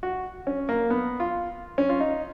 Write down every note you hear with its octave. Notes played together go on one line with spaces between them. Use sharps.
F#4
C#4
A#3
B3
F4
C#4
F4
D#4